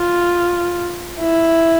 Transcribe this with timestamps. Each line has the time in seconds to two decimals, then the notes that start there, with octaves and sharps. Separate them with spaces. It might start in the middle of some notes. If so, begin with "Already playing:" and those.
Already playing: F4
1.20 E4